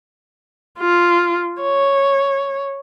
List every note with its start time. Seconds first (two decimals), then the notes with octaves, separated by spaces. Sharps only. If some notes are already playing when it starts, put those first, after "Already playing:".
0.79 F4
1.62 C#5